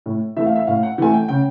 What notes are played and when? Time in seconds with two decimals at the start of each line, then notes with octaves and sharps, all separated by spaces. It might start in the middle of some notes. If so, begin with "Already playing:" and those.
0.06 A2
0.36 E3 A3 E5
0.46 F5
0.56 E5
0.67 A2 F5
0.83 F#5
0.98 E3 A3 G#5
1.14 G5
1.28 C#3 G5